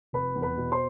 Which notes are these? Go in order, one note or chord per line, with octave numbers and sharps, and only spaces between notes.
F1 B4 B5
E2
B4 B5
B2
C5 C6